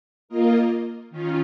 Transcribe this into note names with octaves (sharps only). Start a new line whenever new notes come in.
A#3 F4 A#4 D#5
D#3 C#4 F4